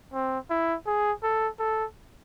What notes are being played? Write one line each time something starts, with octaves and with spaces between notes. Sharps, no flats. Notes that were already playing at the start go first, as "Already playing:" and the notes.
C4
E4
G#4
A4
A4